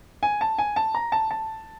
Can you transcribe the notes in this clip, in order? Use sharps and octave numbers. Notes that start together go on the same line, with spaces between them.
G#5
A5
G#5
A5
A#5
A5
A5